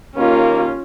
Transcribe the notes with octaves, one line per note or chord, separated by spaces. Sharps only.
D#2 A#3 C#4 F4